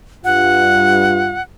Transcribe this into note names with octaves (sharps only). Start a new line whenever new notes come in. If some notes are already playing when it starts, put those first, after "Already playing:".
G2 F4 F#5